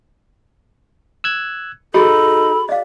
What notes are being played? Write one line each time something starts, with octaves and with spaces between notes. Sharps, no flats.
E6 F#6 G#6
D#4 F#4 G#4 A4 B5
D5 D#5 F5